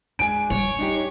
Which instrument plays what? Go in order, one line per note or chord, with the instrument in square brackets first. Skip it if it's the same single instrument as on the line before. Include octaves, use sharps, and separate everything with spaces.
[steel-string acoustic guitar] G#3 D4 [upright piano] G#5 D7
[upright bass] G3 [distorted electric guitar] C#5
[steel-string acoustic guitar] D4 D#4 G4